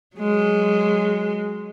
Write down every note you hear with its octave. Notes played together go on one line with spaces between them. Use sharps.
F#3 G#3